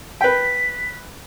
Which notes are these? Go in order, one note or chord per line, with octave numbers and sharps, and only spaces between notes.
B4 G5 B6